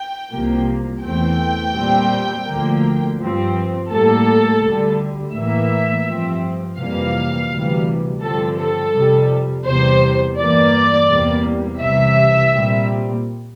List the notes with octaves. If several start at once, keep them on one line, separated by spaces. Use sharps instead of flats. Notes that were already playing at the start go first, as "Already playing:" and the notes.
Already playing: G5
C2 C3 F3 A#3
E2 E3 A3 C4 G5
A#2 G3 C4
D2 D3 F3 A#3
G2 F3 C4
A2 G3 A#3 A4
D2 D3 G3
A2 E3 A#3 E5
G2 F3 C4
F2 C3 E3 G3 A#3 F5
D2 C3 E3 G3
G2 D3 F3 C4 A4
A4
F2 C3 G3
E2 C3 G3 C5
G2 E3 A#3 D5
E2 C3 G3 A#3
C2 C3 E3 E5
A#2 G3 C4